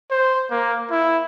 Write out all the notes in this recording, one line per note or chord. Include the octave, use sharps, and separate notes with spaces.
C5
A#3
E4